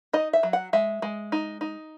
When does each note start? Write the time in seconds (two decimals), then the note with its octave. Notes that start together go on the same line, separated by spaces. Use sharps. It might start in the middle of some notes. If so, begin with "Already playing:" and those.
0.13 D#4 D#5
0.33 E5
0.43 F#3
0.53 F#5
0.73 G#3 E5
1.02 G#3
1.32 D#4
1.61 D#4